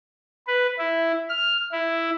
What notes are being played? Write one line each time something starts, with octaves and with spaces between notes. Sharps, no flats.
B4
E4
F6
E4